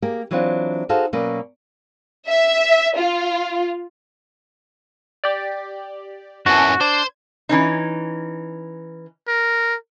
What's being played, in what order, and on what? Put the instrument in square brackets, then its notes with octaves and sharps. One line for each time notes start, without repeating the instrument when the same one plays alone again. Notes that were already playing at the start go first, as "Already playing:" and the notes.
[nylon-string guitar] A#3 G4 G#4 A#4
E3 F#3 C4 D4 F4 F#5
D#4 F#4 G#4 A4 C5 F5
B2 F#3 A#3 C#4 B4 D5
[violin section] E5
F4
[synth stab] G4 D5
[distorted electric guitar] F#2 E3 [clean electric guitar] F#4 [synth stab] G#5 A5
[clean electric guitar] D4 [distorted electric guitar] C5 [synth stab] G#6
[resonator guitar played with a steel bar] E3 C#4 D#4
[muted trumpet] A#4